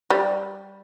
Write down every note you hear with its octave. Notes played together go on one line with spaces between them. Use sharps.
G3